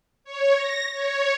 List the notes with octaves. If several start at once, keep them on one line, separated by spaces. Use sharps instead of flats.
C#5
A#6
C#5